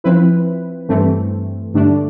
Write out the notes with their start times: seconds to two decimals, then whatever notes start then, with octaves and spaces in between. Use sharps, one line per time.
0.04 F3 C4 E4 B4
0.89 G2 E3 A3 C4
1.74 G2 D3 A3 D4